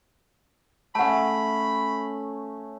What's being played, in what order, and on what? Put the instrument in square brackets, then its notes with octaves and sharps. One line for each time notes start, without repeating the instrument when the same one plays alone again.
[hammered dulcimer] A3 C#4 [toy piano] F#5 A5 [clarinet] B5